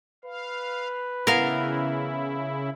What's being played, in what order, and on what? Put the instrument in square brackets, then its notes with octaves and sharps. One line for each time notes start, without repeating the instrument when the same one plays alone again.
[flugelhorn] B4 [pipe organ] F5
[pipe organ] C#3 E4 [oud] E3 B3 [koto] A#4 F5